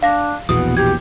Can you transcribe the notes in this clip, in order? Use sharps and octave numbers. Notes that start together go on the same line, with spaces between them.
D4 F5 A#6
A#1 E2 B2 B3 D#6
G4 G#6